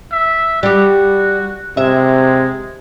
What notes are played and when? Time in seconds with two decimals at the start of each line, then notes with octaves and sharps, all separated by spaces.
0.12 E5
0.63 G3 F#4 G4
1.77 C3 G#3 E5